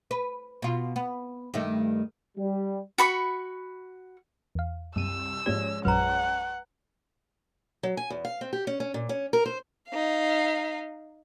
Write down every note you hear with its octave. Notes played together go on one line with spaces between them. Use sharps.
B4
B2 F4
B3
G2 D#3 A3
G3
F#4 B5 C#6
E2 F5
C2 F#2 E6 D#7 E7
G#2 F3 G#3 C#4 G4 D5
A#1 F#2 F#3 B4 F#5 A#5
F#3
G#5
E2
F5
C4
G4
C#4
C#4
A#2
C#4
A#4
C5
D#4 F5